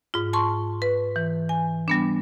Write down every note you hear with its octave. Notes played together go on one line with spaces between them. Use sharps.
G#2 F4
A5 C6 C#6
B4
E3
G#5
G3 B3 D4